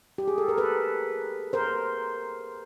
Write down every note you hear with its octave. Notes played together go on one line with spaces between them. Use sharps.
G4
G#4
A4
A#4
A4 B4
A#4 C5